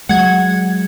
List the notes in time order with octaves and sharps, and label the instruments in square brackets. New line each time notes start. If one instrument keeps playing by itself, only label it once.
[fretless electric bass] F#3 G#3 [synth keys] F#5 G#6